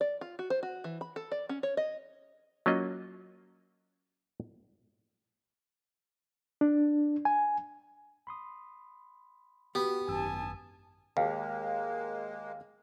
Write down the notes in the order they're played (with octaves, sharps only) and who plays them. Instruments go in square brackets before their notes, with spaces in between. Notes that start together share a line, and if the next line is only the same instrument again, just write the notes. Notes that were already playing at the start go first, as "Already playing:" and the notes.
[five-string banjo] D5
F4
F#4
C5
F#4
E3
B5
A4
D5
C#4
C#5
D#5
[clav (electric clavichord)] F#3 A#3 C#4 F4 D#5
[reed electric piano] D4
G#5
[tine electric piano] B5 C6 D#6
[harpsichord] B3 [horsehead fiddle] F#4 [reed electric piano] G4
[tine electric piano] G#1 F#2 E6 [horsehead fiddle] G#5 A5
[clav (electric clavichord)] D#2 [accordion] G#3 A#3 [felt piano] G#4 F5